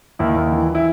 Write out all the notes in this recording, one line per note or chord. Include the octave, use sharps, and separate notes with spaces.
D#2 E4
D#2
E3
E3
E4